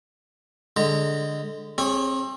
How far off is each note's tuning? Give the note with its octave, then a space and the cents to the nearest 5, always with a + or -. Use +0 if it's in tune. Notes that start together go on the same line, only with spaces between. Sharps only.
D3 +0 G#3 +0 A#5 -25
C4 +30 G#4 +0 C#5 +0